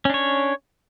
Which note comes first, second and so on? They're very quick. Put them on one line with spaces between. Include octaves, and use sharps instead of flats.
C#4 D4 C#5